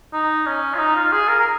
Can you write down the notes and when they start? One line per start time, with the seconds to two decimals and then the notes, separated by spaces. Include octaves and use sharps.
0.13 D#4
0.46 C#4
0.74 F4
0.79 D#4
0.96 F4
1.12 G#4
1.28 A#4
1.39 A#4